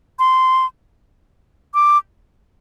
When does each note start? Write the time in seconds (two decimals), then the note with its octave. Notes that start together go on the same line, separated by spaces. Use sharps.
0.19 C6
1.74 D6